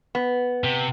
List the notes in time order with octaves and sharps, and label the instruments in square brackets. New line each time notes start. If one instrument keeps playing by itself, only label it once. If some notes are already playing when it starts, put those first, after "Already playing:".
[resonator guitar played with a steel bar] B3
[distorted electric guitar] C3